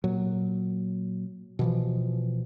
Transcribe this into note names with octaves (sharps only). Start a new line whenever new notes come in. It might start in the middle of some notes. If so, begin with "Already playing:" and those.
A#2 F#3
B2 E3 F3